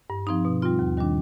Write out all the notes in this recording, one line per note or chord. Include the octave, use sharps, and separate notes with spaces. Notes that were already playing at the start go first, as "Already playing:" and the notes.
G2
F3 C4 D#4
B2
G3 C4 F4
D#2
D#3 G3 D4